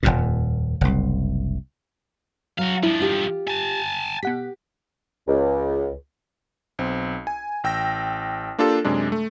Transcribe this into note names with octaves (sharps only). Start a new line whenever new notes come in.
D#1 G#1 F2 A#2
F#1 C2
F#3 F#4 F5
G2 F3 E4
F4 G4
G#5 A5
B2 G4 F#5 B6
C#2
B1 C4
G#5
A1 G5 E6 A#6
A#3 D4 F4 G4 A4
F#2 C3 G#3 D4
A3